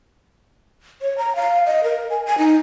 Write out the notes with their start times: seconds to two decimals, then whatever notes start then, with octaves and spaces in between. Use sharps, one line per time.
1.02 C#5
1.18 A#5
1.35 F5
1.66 D#5
1.84 A#4
2.10 G#5
2.26 G#5
2.38 D#4